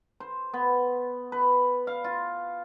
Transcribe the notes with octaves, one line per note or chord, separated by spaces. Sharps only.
C5
B3
B4
F5
F4